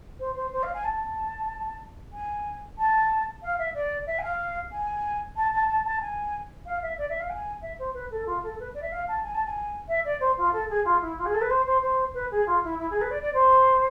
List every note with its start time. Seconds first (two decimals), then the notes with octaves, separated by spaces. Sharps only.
0.20 C5
0.35 C5
0.52 C5
0.63 F5
0.74 G#5
0.84 A5
2.13 G#5
2.78 A5
3.43 F5
3.58 E5
3.74 D5
4.06 E5
4.18 G#5
4.23 F5
4.72 G#5
5.36 A5
5.53 A5
5.68 A5
5.85 A5
6.01 G#5
6.66 F5
6.82 E5
6.98 D5
7.09 E5
7.20 F5
7.30 G#5
7.62 E5
7.79 C5
7.94 B4
8.11 A4
8.26 F4
8.43 A4
8.60 B4
8.74 D5
8.81 E5
8.92 F5
9.08 A5
9.23 G#5
9.34 A5
9.46 G#5
9.88 E5
10.05 D5
10.20 C5
10.37 F4
10.52 A4
10.69 G#4
10.85 F4
11.01 E4
11.18 F4
11.25 G#4
11.34 A4
11.41 B4
11.50 C5
11.66 C5
11.82 C5
12.14 B4
12.31 G#4
12.46 F4
12.63 E4
12.78 E4
12.90 G#4
13.01 B4
13.11 D5
13.22 D5
13.33 C5